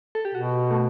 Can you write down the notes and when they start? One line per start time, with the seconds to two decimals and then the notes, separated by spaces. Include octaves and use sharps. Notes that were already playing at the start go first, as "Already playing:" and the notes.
0.15 A4
0.25 G4
0.34 B2 F#4
0.71 A3